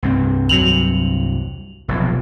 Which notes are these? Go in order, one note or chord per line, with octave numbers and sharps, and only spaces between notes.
C2 G2 C4
E2 C3 F#3 F7 F#7
F1 B1 E2 B2 F3